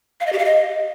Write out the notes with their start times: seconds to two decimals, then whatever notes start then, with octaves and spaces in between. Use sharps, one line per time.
0.20 F5
0.26 D#5
0.33 G4
0.39 F5
0.45 D#5